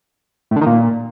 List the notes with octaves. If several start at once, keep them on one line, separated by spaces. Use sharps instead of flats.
A2
D3
D#3
A#2